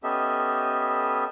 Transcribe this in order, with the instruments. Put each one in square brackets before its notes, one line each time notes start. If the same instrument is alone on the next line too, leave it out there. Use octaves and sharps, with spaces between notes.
[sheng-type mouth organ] B3 C#4 G4 A4 D#5 E5